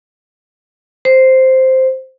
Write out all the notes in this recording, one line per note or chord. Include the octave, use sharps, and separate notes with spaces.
C5